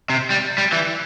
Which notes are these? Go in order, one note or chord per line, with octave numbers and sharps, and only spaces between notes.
C3
G3
G3
E3